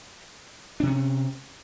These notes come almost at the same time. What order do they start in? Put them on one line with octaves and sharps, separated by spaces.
D4 C3 C#4